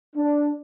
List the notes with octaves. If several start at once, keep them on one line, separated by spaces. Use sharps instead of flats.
D4